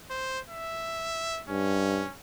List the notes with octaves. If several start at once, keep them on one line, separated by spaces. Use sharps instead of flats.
C5
E5
G2 C#4